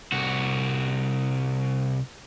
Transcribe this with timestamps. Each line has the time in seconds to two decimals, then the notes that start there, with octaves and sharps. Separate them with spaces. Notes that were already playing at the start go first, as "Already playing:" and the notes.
0.12 C2 F#4